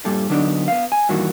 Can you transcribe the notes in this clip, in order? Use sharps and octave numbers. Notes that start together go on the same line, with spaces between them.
G2 A#2 G3 A4
D3 F#3 B3 D4 D#4
B3 F5
G#5
G2 A#2 D#3 E3 F#4